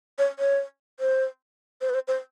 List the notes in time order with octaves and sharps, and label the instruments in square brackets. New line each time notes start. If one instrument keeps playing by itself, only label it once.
[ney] C#5
C#5
C5
C5
B4
C5
C5